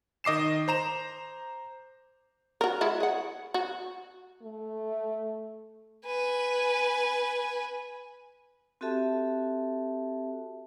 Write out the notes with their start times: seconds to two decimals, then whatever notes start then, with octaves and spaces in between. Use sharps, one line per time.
0.24 D#3 D#5 D6 C7 E7
0.68 C5 A#5 E7
2.61 F#4 A#4
2.81 G#3 E4 F#4
3.00 G#4 F#5
3.54 F#4
4.43 A3
6.06 B4 G#5
8.81 C4 F#4 G4 A4 E5 A5